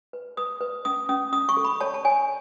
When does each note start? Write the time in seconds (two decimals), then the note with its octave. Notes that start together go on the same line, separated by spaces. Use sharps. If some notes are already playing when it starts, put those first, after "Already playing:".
0.13 B4
0.37 B4 D#6
0.61 B4
0.85 C#4 D#6
1.09 C#4 D#6
1.33 C#4 D#6
1.49 C#6
1.57 A4
1.64 B5
1.81 C#5 A5
1.94 A5
2.05 C#5 G#5